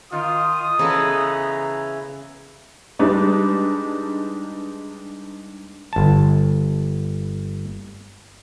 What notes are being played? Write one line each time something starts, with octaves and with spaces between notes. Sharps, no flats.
D#3 F4 D#6
C#3 E3 B3 A4 A#5
G3 G#3 D4 D#4 B4
G1 A5